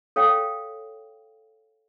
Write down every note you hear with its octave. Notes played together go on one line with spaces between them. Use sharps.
A4 C#5 F5 G5